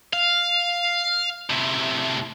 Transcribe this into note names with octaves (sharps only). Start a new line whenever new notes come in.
F5
A2 C3